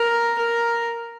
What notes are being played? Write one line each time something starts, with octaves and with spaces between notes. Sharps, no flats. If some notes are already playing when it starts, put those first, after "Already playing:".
Already playing: A#4
A#4